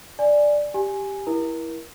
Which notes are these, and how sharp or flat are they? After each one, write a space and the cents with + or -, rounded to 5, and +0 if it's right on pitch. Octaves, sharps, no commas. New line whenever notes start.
D5 +0 G#5 +0
G4 +0 G#5 +0
E4 +0 A#4 +30